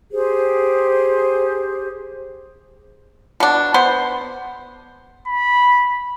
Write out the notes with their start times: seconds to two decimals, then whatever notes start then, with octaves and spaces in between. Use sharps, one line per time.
0.12 G4 G#4 C5
3.40 B2 D4
3.74 B3 C5
5.27 B5